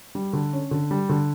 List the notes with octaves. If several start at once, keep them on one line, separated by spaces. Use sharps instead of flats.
G3
D3
C#4
D3
G3
D3